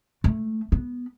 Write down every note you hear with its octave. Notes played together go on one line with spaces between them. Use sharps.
A3
B3